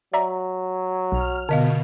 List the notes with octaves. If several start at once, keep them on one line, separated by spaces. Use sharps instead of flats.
F#3 D5 E5 A#5
B1 F6
B2 D3 D#5 F5